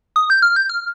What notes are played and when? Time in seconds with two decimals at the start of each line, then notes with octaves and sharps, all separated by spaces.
0.16 D#6
0.30 G6
0.42 F6
0.56 G6
0.69 F6